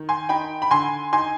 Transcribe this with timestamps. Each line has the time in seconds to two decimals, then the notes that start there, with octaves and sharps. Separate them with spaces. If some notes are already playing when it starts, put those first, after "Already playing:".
Already playing: D#3
0.09 G#5 C6
0.29 D#4 G5 B5
0.62 B5
0.71 D3 G#5 C6
1.13 D#4 G#5 C6